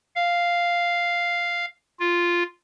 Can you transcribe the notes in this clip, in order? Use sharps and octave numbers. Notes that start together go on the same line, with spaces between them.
F5
F4